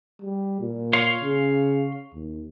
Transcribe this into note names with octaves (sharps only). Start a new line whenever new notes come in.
G3
A#2
C#5 F5 C6
C#3
D#2